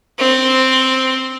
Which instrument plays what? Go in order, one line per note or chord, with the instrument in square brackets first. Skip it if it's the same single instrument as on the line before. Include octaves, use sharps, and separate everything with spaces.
[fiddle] C4